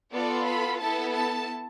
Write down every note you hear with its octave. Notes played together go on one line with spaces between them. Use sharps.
B3 F4 A4 D5
B5
B3 E4 A4 A5
A5